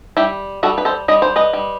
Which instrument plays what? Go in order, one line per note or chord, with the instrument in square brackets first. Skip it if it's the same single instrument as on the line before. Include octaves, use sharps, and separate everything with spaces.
[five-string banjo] G3 E4 G4
G3 F#4 A4
B4
A4 C5
G3 D#5
C5
B4 D#5
G3